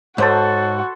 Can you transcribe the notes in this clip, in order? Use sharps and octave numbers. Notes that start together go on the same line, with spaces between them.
G#2 F#4 A4 C5 C#5 A5 B5